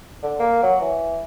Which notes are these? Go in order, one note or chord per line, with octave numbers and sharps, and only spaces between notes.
D3
A#3
F#3
E3